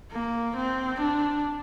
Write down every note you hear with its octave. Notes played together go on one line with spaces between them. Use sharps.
A#3
C4
D4